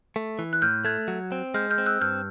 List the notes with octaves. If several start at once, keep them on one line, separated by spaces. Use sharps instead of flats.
A3
E3
F#6
A2 F6 G6
A3 F#6 G#6
F#3
C4
G#3 F6 G6
F6 G6
C4
E6 F#6
G2 F6 G6